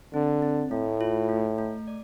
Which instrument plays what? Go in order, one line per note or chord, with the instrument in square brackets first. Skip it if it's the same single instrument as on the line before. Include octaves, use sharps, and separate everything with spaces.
[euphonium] D3 [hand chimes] C4
[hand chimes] C4
[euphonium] A2 [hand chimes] A3
[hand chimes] F4
A3
A3
D5